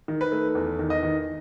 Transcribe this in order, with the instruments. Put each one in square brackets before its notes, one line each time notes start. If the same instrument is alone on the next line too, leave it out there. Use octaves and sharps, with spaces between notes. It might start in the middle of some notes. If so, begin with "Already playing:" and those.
[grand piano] D#3
B4
A3
E2
D#3
D#5
D#3